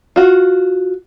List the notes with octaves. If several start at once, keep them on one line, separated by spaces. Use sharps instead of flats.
F4 F#4